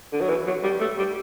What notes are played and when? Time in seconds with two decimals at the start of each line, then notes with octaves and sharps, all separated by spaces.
0.13 D3
0.21 F#3
0.29 E3
0.46 F#3
0.63 G3
0.80 A3
0.98 G3